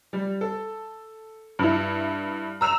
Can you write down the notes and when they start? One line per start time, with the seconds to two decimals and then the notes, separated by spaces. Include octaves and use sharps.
0.13 G3
0.41 A4
1.59 G2 E4
2.61 A#5 E6 E7 F7